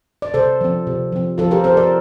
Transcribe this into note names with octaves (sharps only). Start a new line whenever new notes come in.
D5
C3 A4 C5
F3 C4
C3
F3 C4
F3 F4 A4
G4 A#4
C4 A4 C5
A#4 D5